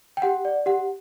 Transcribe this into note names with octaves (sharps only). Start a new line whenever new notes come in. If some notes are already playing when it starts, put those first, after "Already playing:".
G5
G4 F#5
D5
G4 F#5